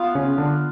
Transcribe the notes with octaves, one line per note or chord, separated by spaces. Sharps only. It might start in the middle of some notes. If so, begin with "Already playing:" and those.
Already playing: B3 F4 B4 F5
C#3 C#4
D3 D4